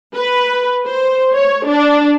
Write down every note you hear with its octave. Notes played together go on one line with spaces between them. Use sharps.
B4
C5
C#5
D4